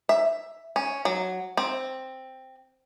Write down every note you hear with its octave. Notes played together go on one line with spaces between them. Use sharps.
E5
C#4
F#3
C4